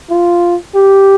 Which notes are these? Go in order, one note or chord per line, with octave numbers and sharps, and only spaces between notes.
F4
G4